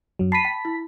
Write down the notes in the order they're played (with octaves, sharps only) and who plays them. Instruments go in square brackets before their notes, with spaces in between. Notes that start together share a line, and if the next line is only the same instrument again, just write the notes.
[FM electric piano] F#2 F#3
[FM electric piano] A5 B5 B6 [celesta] C7 D#7
[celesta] G5
E4